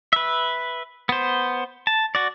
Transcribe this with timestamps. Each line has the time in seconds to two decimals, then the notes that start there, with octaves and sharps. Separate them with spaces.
0.13 B4 E5
1.09 B3 C5
1.87 A5
2.15 F#4 D5